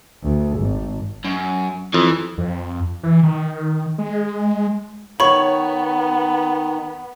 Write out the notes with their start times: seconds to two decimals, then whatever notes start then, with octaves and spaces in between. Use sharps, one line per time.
0.24 D2
0.59 G#1
1.24 F#2
1.94 F2 E3
2.38 F2
3.03 E3
3.23 D#3
3.98 G#3
5.20 D#3 B3 C#5 B5 C#6